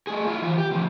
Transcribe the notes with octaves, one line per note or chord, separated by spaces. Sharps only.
A3 G#4
E4 F4
E3 F4
G4
D2 F3